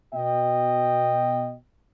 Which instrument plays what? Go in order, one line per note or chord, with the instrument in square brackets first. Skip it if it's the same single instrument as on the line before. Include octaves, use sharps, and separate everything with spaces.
[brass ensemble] B2 D#5 G5